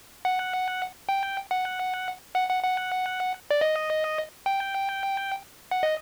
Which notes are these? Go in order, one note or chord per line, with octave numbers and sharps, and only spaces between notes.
F#5
G5
F#5
F#5
F#5
F#5
D5
D#5
G5
F#5
D#5